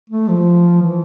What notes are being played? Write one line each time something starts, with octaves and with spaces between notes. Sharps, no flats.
A3
F3
E3